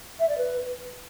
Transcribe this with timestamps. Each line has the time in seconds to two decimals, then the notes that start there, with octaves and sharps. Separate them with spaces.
0.20 E5
0.29 D5
0.38 B4